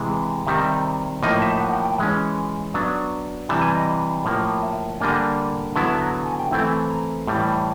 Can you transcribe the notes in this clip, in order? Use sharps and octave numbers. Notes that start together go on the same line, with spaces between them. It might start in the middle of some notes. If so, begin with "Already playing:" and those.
Already playing: C3 E3 G#3
C3 D#3 G3 C4 D#4 E5
A2 F3 A#3 D#4 D#5
E5
F#5
G5
G5
E3 G#3 C#4 G#5
F#3 B3 D4 A5
C3 E3 G3 A5
G#5
D#5
A2 F3 A#3
E5
D3 G3 A#3 D4 G#5
D3 F#3 B3 E4 A5
A#5
A5
G#5
G5
E3 A3 C4 E4 G5
G#5
A5
A#5
A2 E3 G3